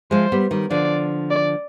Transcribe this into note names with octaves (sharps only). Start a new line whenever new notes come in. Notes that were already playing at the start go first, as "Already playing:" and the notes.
F3 G#3 C5
G3 B3
D#3 G3
D3 F3 D5
D5